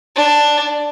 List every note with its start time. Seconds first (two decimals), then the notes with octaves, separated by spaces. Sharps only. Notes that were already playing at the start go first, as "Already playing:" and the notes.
0.16 D4